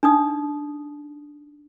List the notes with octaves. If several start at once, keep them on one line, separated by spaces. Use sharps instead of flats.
D4 D#4 D#6